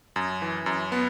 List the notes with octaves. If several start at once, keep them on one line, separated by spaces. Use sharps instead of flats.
F#2
E3
F#2
B3